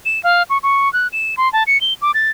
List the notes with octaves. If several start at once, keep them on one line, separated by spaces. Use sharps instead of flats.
E7
F5
C#6
C#6
F#6
E7
C6
A5
C#7
G7
D6
A6